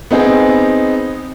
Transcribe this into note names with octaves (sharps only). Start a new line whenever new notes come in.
B3 C4 D#4 G#4